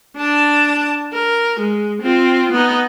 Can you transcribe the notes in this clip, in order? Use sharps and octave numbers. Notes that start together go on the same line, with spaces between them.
D4 A5
A#4
G#3
C4 F4
B3 D#4